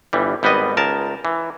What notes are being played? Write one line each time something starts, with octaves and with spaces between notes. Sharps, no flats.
G1 E3 G3
G#1 G3 B3 B4 D#5
C#2 A#4 A5
E3